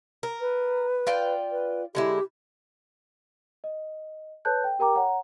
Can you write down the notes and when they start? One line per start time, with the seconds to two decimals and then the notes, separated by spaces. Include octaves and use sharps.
0.23 A#4
0.41 B4
1.07 F4 D5 G5
1.51 B4
1.95 D3 G#3 E4 G4
3.64 D#5
4.45 A4 B4 C#5 A5 F#6 G6
4.64 G5
4.79 G4 A#4 G5 A#5 D6
4.95 C#5 F#5 A#5